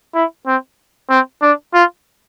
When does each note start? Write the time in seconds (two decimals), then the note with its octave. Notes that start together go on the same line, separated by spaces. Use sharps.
0.14 E4
0.46 C4
1.10 C4
1.42 D4
1.74 F4